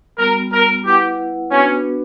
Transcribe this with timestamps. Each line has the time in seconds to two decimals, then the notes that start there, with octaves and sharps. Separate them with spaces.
0.18 G3 B3 F#4 A#4
0.52 A#4
0.85 E4 G4 B4 F#5
1.51 B3 C#4 D4 F#4 B4